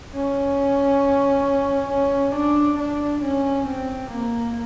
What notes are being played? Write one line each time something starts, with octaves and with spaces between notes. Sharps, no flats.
C#4
C#4
D4
D4
C#4
C4
A#3